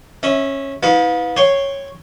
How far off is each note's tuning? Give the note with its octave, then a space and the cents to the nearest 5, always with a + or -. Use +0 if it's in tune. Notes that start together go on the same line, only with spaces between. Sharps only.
C#4 -15 E5 -15
B3 +15 E4 -35 F5 +35
C#5 -5 G5 +0 C6 +0